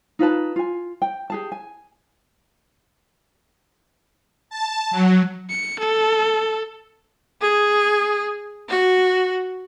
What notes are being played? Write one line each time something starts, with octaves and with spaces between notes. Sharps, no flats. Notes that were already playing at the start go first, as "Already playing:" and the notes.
D#4 F4 B4 A5
F4 G#5
G5
G4 G#4 A5
G#5
A5
F#3
C#7
A4
G#4
F#4